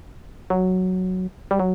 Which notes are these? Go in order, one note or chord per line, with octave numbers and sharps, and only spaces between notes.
F#3
G3
F#3